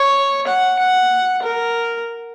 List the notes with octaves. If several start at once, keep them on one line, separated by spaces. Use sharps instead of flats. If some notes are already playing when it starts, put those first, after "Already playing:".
Already playing: C#5
F#5
F#5
A#4